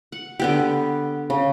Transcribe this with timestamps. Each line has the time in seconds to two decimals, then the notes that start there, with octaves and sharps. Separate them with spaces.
0.12 F#5
0.40 D3 B3 G4
1.30 C#3